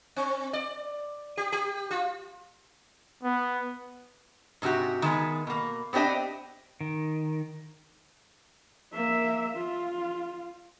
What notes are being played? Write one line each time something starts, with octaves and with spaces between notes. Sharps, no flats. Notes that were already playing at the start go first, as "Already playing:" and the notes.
C4
D5
G4
G4
F4
B3
G#2 C3 C#4 F#4 G4
D#3 G#3 B3
B2 A#3
B3 C4 D4 G4 D#5
D#3
A#3 E5
F4